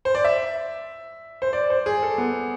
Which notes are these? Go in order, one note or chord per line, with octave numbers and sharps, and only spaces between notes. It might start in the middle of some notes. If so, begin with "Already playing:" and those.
C5
D5
E5
C5
D5
C5
G#4
A4
B3